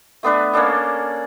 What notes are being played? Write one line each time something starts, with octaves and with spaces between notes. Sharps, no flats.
A3 B3 D4 B4
A#3 C#4 D4 A4